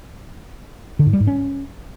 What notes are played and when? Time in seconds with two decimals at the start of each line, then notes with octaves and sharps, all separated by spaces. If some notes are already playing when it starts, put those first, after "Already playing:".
0.99 D3
1.06 G#2
1.13 G3
1.20 G#2
1.27 C#4